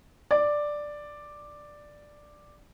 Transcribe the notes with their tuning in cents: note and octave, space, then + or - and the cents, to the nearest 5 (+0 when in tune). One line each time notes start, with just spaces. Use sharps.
D5 +5